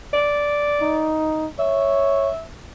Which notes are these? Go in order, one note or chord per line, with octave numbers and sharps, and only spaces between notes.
D5
D#4
C#5 E5